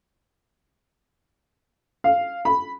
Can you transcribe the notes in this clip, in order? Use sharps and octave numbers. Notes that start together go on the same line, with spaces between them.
F5
B5